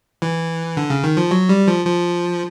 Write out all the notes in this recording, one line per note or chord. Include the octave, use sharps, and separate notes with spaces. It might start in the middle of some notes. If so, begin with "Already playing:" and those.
E3
D3
C#3
D#3
F3
F#3
G3
F3
F3